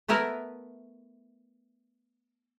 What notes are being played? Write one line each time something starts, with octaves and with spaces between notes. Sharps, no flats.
A3 B3 E4 A#4 B4